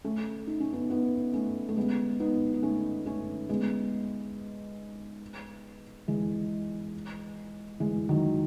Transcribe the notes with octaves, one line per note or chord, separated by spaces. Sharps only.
A3 C#4
D#4
C#4
B3 D#4
B3 D#4
A3 C#4
A3
G#3 B3
B3 D#4
D#4
A3 C#4
A3 C#4
G#3 B3
E3 G#3
E3 G#3
D#3 F#3